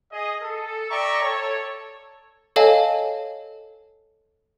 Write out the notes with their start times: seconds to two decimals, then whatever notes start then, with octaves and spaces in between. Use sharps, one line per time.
0.12 G#4 D#5
0.42 A4
0.89 D5 E5 G5 A#5 C#6
1.22 A4 C#5
2.56 A4 C#5 D#5 F5 G#5 A5